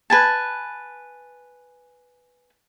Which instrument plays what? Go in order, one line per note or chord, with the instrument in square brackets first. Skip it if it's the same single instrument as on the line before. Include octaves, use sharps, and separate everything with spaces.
[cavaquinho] B4 G#5 A5